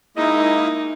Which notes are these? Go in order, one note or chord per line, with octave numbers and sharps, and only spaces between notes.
G#3 A#3 D#4 E4 D#5